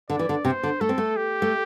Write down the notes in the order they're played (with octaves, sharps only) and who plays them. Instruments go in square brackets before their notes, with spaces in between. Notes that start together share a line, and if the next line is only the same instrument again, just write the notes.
[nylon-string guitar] D3 [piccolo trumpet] D5
[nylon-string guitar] E3
D3
[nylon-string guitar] C3 [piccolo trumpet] C5
[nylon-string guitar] D3
[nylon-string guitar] A3 [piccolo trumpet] A4
[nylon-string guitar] C4
A3
[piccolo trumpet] G4
[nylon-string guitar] A3